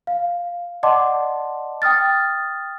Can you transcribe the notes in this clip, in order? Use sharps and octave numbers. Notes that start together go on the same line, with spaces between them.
F5
D5 D#5 F#5 A5 C6 D6
G5 D#6 F6 A6